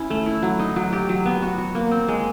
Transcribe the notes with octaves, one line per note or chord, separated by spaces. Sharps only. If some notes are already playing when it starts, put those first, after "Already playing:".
Already playing: C#4 E4
A3
E4
F#3
D#4
F#3
G4
F#3
B3
F#4
F#4
A#3
C4
G#3